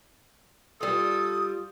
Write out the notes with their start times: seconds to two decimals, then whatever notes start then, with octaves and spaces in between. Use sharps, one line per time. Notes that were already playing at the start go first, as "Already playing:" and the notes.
0.80 G3 F4 A4 D#6